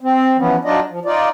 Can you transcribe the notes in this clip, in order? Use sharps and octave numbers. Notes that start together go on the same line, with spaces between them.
C4
E3 F3 B3 C#4
F#3 D4 D#4 F4 D5 D#5
F3
D#4 F4 D5